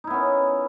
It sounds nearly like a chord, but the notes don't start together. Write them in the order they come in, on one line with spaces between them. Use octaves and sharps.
D#4 E4 B3 C#4